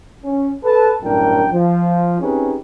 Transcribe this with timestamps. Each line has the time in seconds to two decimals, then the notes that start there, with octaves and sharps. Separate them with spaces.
0.23 C#4
0.64 A4 B4 A5
1.02 G1 F#2 A2 D4 A#4 G5
1.52 F3
2.20 C4 C#4 D#4 G4 G#4 B4